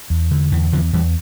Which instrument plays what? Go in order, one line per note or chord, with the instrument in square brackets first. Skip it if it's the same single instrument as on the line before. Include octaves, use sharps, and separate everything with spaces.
[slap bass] E2
D3
E2 E3
E2 D3 F3
E2 E3 G3